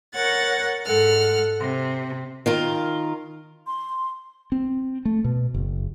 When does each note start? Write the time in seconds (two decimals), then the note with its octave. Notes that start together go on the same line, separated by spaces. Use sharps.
0.13 A#4 C#5 F#5 F#6 A6
0.84 G#2 A4 F#5 F6
1.61 C3
2.46 D#3 F4 A#4
3.67 C6
4.52 C4
5.05 A3
5.24 B2
5.54 F#1